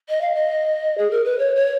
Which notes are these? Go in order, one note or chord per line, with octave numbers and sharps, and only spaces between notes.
D#5
F5
D#5
G#4
A#4
B4
C#5
C#5